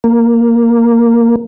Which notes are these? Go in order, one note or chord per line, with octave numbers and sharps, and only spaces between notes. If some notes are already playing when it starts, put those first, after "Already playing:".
A#3